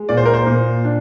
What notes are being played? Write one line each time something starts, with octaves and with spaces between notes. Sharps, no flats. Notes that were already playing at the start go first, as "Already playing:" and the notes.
Already playing: G#3
A#2 D5
C5
A#4
C5
A#2
D4